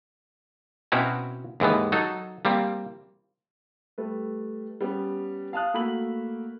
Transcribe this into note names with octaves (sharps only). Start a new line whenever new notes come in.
B2 C4 C#4 E4 F#4 A#5
D#2 G#2 E3 B3
F#3 D#4 A4
G3 A#3 C4
G3 A3 B4
G3 B3 C#4
F5 A5 D#6 F#6
A3 A#3 F#4 B5 E6 F#7